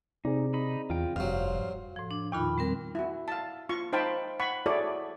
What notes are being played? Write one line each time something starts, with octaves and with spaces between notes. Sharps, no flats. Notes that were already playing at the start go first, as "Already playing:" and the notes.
C3 C4 D#4 G#4 D5
D#4 B5
E2 F4 G5
F1 G2 F#3 C5 F5
F2 G#2
A2 F3
D4
E2 A#2 D#3 D#4 F4 B5
G3 C4 A#4
E4 F#4
F5 A5
F4 C#6
D#4 C5 F5 G5 A5 B5
F#5 B5 C#6
E4 F#4 G#4 A4 C#5 D5